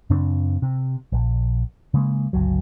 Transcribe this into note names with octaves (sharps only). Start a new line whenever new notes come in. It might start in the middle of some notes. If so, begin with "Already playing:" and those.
F#2 C#3 C4 D4
C3
A#1
C#3 G#3 A#3
G1 C#2 F#3